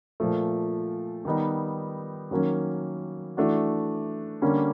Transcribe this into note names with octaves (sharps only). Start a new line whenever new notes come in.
A#2 F3 A3
D#3 G3 B3 D#4
D#3 F#3 A#3 C#4
E3 A3 D4 F#4
D3 G3 A#3 C#4